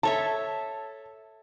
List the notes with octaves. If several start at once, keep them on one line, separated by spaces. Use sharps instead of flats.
A4 C#5 E5 A5